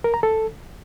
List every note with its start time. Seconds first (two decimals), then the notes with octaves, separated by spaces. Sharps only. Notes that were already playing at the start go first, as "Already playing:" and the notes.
0.04 A#4
0.14 A#5
0.23 A4